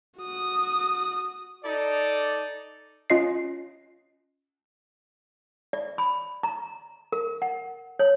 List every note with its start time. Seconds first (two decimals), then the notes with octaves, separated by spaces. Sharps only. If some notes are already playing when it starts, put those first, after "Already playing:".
0.21 F#4 D#6
1.64 D#4 A4 D5
3.10 C#4 F4 D#5 C7
5.73 D5
5.98 B5
6.43 A#5
7.12 A#4
7.42 F#5
7.99 C#5